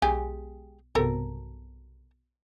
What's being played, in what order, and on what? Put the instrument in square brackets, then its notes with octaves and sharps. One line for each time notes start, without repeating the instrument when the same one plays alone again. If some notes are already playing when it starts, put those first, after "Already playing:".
[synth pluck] B1 [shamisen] G#3 G4 G#5
[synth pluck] B1 G2 C3 [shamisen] A4 A#4